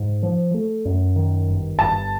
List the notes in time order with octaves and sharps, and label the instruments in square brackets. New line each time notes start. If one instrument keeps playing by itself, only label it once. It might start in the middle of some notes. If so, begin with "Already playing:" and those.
Already playing: [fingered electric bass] G#2
F3
A3
F#2
D#3
G1
[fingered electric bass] G1 [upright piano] A5